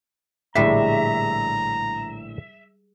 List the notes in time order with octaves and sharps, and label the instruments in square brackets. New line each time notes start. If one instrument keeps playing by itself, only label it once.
[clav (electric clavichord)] A#1 A2 D3 [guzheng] G3 G#3 [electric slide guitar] E5 [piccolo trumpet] A#5